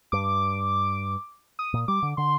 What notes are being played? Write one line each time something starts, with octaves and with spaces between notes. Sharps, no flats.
G2 D6
D#6
A#2
G3 D6
D3
D3 C6